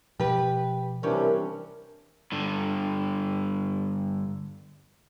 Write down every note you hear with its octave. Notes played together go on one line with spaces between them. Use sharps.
B2 F3 G4 B4
C3 E3 G3 C#4 D4 A#4
G2 D3